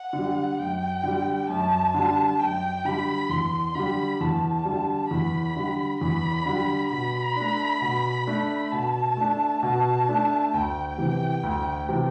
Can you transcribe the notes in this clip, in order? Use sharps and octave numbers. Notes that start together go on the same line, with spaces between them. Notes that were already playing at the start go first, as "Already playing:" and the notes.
Already playing: F#5
D3
G3
F#2 G5
D3 G3
F#2 A5
D3 G3
F#2 G5
D3 G3 B5
E2 C6
D3 G3 B5
E2 A5
D3 G3
E2 B5
D3 G3
E2 B5
D3 G3
B2 B5
A3 D4
B2
A3 D4
B2 A5
A3 D4
B2 A5
A3 D4
D2 G5
C3 E3
D2
C3 E3